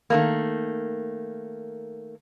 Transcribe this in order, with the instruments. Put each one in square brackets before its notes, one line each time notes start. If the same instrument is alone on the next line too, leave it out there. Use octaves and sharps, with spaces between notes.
[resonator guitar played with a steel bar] D#3 A3 A#3